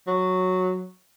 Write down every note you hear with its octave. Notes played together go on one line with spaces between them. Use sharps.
F#3